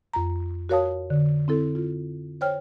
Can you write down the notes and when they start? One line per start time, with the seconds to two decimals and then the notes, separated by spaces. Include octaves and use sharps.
0.14 F2 A#5
0.69 F#4 A#4 C#5 F5 A5 D#6
1.10 D3
1.48 C4 E4 A4
1.75 F4
2.41 C5 C#5 G5 F6